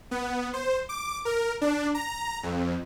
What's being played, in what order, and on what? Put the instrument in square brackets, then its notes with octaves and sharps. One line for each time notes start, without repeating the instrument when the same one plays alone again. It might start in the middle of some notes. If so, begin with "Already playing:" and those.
[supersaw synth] B3
C5
D6
A#4
D4
A#5
F2